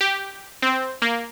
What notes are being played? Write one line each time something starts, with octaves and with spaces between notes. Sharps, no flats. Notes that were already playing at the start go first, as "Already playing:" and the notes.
G4
C4
A#3